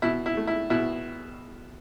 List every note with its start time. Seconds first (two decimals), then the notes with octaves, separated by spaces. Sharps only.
0.02 B2 E4
0.26 E4
0.37 A3
0.47 E4
0.70 B2 E4